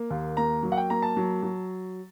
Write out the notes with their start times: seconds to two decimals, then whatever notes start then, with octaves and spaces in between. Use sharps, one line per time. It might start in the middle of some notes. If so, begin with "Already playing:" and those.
Already playing: A#3
0.10 D#2
0.37 A#3 A#5
0.63 F#3
0.72 F#5
0.77 G5
0.90 A#3 A#5
1.02 A5
1.17 F#3
1.43 F#3